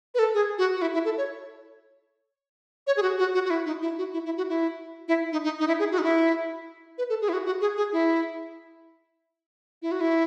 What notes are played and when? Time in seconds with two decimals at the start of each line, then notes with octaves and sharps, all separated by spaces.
0.15 B4
0.19 A4
0.34 G#4
0.58 F#4
0.76 F#4
0.82 E4
0.94 E4
1.05 A4
1.18 C#5
2.87 C#5
2.97 G#4
3.02 F#4
3.19 F#4
3.34 F#4
3.45 F#4
3.50 E4
3.66 D#4
3.82 E4
3.98 F#4
4.14 E4
4.25 E4
4.37 F#4
4.49 E4
5.08 E4
5.32 D#4
5.44 D#4
5.60 D#4
5.68 E4
5.79 G#4
5.91 F#4
5.98 D#4
6.03 E4
6.98 B4
7.10 A4
7.21 G#4
7.29 E4
7.33 F#4
7.46 F#4
7.61 G#4
7.77 G#4
7.93 E4
9.82 E4
9.92 F#4
10.01 E4